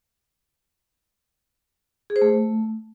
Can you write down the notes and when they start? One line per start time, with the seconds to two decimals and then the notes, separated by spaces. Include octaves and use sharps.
2.10 G#4
2.16 C5
2.22 A3